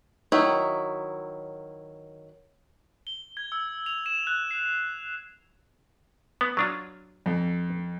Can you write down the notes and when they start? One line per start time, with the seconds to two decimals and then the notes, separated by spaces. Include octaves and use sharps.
0.32 D#3 F#3 E4
3.07 G7
3.37 G#6
3.52 E6
3.86 F7
4.06 E7
4.27 F#6
4.51 C7
6.41 B3
6.57 F#3 D4 F4
7.26 F2